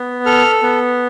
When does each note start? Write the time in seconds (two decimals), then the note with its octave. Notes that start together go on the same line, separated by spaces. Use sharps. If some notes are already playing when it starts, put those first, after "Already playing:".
Already playing: B3
0.26 A4 F6
0.63 B3